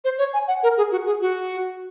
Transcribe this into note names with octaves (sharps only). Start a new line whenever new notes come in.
C5
C#5
G#5
F#5
A#4
G#4
F#4
G#4
F#4